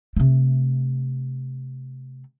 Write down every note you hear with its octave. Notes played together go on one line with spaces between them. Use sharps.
C3 A3